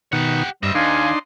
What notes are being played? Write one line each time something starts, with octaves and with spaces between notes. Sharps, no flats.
B2 D#3 G4 F#5
G2 G3 C4 D#5 E5
D#2 D4 D#4 F5 G#5 C6